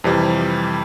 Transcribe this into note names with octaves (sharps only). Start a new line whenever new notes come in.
F2 C3 E3 G3